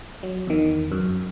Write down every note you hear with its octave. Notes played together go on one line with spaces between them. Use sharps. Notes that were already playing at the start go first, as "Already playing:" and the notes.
F#3
E2 D#3
F#2